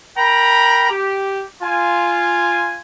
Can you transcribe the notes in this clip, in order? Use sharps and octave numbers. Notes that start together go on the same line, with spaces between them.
A#4 G5 A#5 B5
G4
F4 G#5